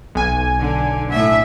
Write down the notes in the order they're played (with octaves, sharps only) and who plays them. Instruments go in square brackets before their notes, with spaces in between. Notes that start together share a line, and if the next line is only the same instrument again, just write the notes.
[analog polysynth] B1 G#5
[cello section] D3
A2 E5